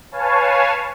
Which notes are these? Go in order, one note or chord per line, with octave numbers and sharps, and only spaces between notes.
B4 C#5 F5 G#5 A5